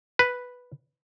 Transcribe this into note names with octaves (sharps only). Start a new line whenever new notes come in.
B4